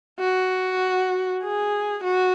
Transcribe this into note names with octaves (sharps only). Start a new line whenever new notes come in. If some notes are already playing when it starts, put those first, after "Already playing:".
F#4
G#4
F#4